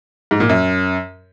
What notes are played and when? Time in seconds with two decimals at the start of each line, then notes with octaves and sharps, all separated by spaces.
0.31 G#2
0.40 A#2
0.49 F#2